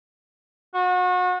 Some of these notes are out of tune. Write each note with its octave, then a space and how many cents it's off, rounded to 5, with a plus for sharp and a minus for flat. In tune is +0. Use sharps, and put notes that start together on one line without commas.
F#4 -35